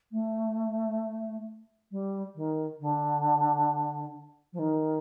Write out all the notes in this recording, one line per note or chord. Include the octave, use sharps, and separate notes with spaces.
A3
G3
D#3
D3
F3
D#3